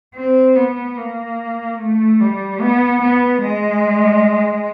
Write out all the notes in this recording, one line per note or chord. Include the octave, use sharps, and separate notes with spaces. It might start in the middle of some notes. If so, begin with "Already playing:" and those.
C4
B3
A#3
A3
G3
B3
B3
G#3